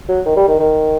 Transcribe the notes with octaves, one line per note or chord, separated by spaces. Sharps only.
F#3
D#3
G3
D#3
D#3